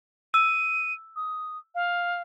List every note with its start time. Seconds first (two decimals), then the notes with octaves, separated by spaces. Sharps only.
0.34 E6 D#7
1.16 D#6
1.75 F5